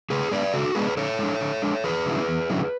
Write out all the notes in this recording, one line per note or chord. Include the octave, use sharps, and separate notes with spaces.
C#3 G#4 B4
G#3 B3 D4 B4 D5
C#3 F#4 A4
G#3 B3 D4 G#4 B4
D3 A4 C#5
G#3 D4
D3
G#3 D4
E2 G#4 B4
D3 F#3 C#4 E4
E2
D3 F#3 C#4 E4